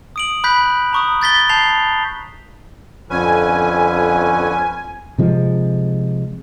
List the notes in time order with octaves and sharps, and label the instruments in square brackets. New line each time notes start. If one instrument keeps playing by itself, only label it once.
[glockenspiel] D#6 D7 F#7
B5 F#6 G6 B6
A#5 C#6 D#6
G6 A6 B6 G7
A5 G6 C7 F7 G7
[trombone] F2 [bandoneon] D3 C#4 B4 [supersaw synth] G#5
[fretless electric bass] C3 F3 G#3